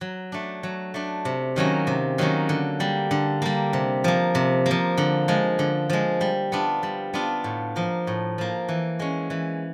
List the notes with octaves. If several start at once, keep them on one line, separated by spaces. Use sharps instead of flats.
F#3
A3 D4
F#3
A3 D4
C3
D#3 F#3 A#3 C#4
C3
D#3 F#3 A#3 C#4
D3
G3 A#3
D3
G3 A#3
C3
F3 A#3
C3
F3 A#3
D3
F3 G#3
D3
F3 G#3
G3
B3 D4 F4
G3
B3 D4 F4
A2
F3 A#3
A2
F3 A#3
E3
G#3 C#4
E3